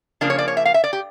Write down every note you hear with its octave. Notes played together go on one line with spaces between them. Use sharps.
C#3 F3 A#3 D4
C#5
D5
C#5
E5
F5
E5
D5
G4